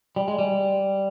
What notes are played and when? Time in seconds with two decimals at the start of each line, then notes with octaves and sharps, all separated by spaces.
0.16 G3
0.28 G#3
0.39 G3